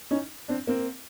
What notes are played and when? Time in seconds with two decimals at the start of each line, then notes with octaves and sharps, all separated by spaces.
0.11 C#4 D#4
0.48 C4 D4
0.67 A#3 C4